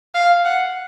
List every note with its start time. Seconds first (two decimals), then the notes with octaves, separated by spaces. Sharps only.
0.15 F5
0.45 F#5